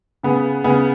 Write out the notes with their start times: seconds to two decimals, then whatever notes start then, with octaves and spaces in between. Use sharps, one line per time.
0.23 C#3 B3 G#4
0.64 C#3 B3 G#4